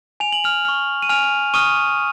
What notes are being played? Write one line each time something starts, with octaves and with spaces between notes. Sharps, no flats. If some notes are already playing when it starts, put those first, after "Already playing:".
G#5 F7
F#7
F6 F7
C#6 F6
D#7
G#5 F6 F7
C#6 D#6 F6 D#7